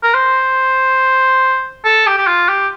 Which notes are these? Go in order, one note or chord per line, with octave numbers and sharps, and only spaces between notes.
A#4
C5
A4
G4
G4
F4
G4